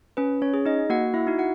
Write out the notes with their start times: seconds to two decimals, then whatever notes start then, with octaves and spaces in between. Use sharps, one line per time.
0.17 C#4 B4
0.42 C#4 C#5
0.54 G#4
0.65 D#4 D#5
0.90 A#3 F#4 F#5
1.14 E4 E5
1.27 D#4 F#4
1.38 F#4 F#5